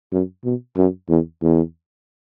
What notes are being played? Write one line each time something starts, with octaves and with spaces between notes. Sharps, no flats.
F#2
B2
F#2
E2
E2